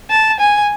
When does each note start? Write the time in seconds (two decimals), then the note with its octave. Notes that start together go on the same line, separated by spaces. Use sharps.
0.10 A5
0.40 G#5